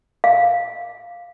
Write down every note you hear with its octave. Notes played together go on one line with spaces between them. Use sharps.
F5